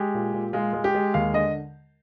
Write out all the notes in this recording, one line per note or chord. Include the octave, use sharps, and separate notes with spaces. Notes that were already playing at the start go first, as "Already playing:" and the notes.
Already playing: G#3 G4
A#2
A#2
G#3 F4
G#3
G4
G#3
D#2 F5
D3 D#5